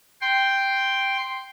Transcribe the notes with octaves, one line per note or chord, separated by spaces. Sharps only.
G5 C6